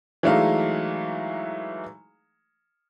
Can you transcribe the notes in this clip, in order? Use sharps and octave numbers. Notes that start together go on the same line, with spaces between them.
E3 F#3 G#3 A3 D#4 F5